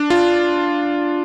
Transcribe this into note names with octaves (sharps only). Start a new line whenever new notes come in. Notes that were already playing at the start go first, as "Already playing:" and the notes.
Already playing: D4
F4